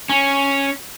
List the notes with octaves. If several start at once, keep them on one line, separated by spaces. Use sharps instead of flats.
C#4